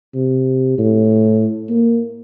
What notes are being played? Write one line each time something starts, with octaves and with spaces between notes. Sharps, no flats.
C3
A2
A#3